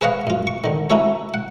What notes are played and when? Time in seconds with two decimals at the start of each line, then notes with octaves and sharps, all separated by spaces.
0.01 G#4 B4 C#5 D#5 F5 F#5
0.27 F#2 F4
0.47 C#6
0.64 D3 D#3
0.90 C#4 D#4 E4 F#4 A4 C#5
1.34 F#5